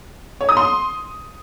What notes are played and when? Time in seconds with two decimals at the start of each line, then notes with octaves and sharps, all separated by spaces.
0.41 C#5
0.49 D#6
0.57 C6